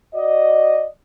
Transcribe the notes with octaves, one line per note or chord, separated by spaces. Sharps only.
F#4 D5 D#5